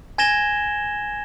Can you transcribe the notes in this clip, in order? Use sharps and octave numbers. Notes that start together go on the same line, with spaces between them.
G#5 G#6 A#6 E7 G7